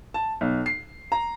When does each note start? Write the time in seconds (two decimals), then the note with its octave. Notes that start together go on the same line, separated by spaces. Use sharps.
0.14 A5
0.41 B1
0.66 C7
1.12 A#5